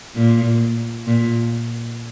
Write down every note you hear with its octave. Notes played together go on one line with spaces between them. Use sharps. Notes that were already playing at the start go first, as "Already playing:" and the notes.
A#2
A#2